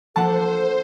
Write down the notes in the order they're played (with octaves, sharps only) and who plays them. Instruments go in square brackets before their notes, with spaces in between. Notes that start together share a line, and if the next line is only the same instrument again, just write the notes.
[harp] F3 A#3 D4 [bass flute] A4 [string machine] C5 [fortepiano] F#5 A5